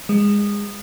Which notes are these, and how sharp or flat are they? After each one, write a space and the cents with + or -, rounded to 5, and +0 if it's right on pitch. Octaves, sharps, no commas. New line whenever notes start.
G#3 -20